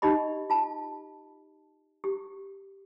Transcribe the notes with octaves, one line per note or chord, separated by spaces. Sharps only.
D#4 G4 D#5 B5
F4 A5
G4